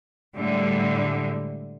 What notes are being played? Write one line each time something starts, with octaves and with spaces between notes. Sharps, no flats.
A2 D3 G3 G#3